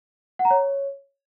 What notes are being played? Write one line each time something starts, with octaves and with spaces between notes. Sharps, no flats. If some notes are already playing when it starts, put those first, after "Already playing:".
F#5
A#5
C#5